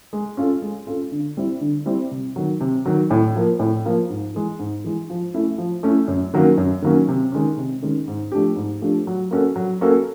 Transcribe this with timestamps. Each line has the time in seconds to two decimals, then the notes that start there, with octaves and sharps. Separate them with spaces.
0.13 G#3
0.37 C#4 F4 A4
0.62 G#3
0.87 C#4 F4 A4
1.12 D3
1.37 G3 C4 E4
1.61 D3
1.86 G3 C4 E4
2.11 C3
2.36 D#3 F#3
2.61 C3
2.86 D#3 F#3
3.11 A2
3.36 F3 A#3
3.59 A2
3.85 F3 A#3
4.10 G#2
4.35 E3 G#3
4.59 G#2
4.85 E3 G#3
5.10 F3
5.34 A3 C#4 E4
5.58 F3
5.83 A3 C#4 E4
6.08 F#2
6.34 D#3 F#3 A#3 C#4
6.58 F#2
6.82 D#3 F#3 A#3 C#4
7.08 C3
7.32 D#3 G#3 C#4
7.57 C3
7.82 D#3 G#3 C#4
8.08 G#2
8.32 F3 A3 D4 G4
8.56 G#2
8.82 F3 A3 D4 G4
9.07 F#3
9.31 A#3 C#4 F#4 A4
9.56 F#3
9.81 A#3 C#4 F#4 A4